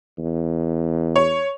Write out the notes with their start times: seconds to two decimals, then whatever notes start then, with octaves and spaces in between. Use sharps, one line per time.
0.18 E2
1.16 C#5